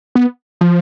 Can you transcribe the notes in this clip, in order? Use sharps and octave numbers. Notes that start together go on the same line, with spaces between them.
B3
F3